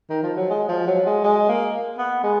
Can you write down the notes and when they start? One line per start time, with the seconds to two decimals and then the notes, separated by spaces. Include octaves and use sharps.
0.10 D#3
0.23 F3
0.36 F#3
0.50 G#3
0.68 F3
0.87 F#3
1.06 G#3
1.24 G#3
1.49 A#3
1.98 B3
2.23 G#3